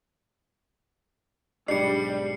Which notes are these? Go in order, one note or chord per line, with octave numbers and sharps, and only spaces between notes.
B1 G#2 G3 D4 C7 C#7